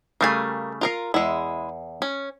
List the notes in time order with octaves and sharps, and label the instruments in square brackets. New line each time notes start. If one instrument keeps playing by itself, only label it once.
[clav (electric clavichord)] C#3 G3 A3 [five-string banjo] A#4 F5 G#5
[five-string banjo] F4 A#4 F5
[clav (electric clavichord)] E2 [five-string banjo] G#3 E4
[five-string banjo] C#4